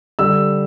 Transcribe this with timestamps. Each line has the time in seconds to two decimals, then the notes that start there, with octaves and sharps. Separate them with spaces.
0.19 D3 G3 E6